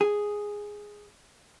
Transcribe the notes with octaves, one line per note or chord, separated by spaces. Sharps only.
G#4